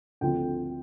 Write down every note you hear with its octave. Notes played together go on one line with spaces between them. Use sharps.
D2 D3 F3 C4 F4 G5